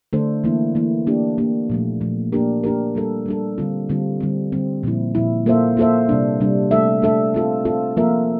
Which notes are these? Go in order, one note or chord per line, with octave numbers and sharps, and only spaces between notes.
D3 A3 D4 A4 C5
E3 A#3 E4
E3 A#3 E4
A#3 D4 G4
A#3 D4 G4
A#2 F3 A3
A#2 F3 A3
A#3 D4 G4 A#4
A#3 D4 G4 A#4
G3 D4 A4
G3 D4 A4
D3 G3 C4 F4
D3 G3 C4 F4
D3 G3 C4
D3 G3 C4
A#2 F3 C4 E4
A#2 F3 C4 E4
A#3 F4 A4 C5 E5
A#3 F4 A4 C5 E5
C3 G3 D4
C3 G3 D4
A3 D4 A4 E5
A3 D4 A4 E5
C4 F4 A4
C4 F4 A4
F3 A#3 F4 A#4 E5